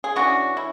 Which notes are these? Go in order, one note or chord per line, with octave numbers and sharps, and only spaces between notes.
G#4
E3 G#3 C#4 D4 F#4
E4